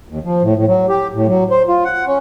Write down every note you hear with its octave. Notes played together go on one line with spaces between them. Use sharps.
D#2
F3
A2
A2
F#3
G4
A2
F#3
C5
F4
F#5
C#4